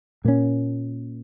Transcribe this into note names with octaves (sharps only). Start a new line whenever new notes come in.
A#2 A#3 C#4